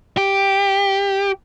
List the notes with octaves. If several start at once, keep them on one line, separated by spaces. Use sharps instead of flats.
G4